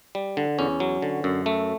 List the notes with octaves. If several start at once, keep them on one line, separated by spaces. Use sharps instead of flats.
G3
D3
E2 C#4
F#3
D3
F#2
A3